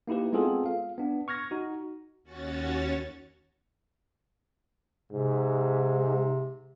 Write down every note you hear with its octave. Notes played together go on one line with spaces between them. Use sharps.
A#3 D#4 E4 G4 B4
G#3 B3 C4 F4 G#4 A4
F5
B3 D4
C#6 F6 G#6 A#6
D#4 F#4
D#2 C#4 F#4 C#5 A6
G#2 C3